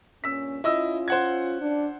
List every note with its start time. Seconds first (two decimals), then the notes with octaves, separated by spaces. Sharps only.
0.24 G2 A#2 C#4 E6 B6
0.64 C#4 E4 F4 D#5 E6
1.08 C5 F#5 G#6
1.61 D4